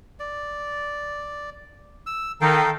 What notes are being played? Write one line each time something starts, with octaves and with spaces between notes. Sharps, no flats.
D5
E6
D#3 D#4 A4 F5 G5